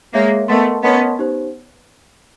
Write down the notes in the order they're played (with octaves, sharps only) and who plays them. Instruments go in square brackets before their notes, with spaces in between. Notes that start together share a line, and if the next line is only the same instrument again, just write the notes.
[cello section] G#3 A#3 [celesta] G#4 C#5 E5
[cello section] A3 B3 [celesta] A#4 D#5 F#5 A5 C6
[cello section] B3 C#4 [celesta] A#4 D#5 F#5 A5 C6
[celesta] D#4 G4 C5